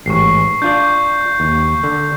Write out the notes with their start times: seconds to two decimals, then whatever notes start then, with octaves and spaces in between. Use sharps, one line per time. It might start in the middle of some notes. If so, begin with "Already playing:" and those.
0.06 A1 G#2 C#6 C7
0.62 D4 F4 D5 G6
1.40 D#2
1.84 D3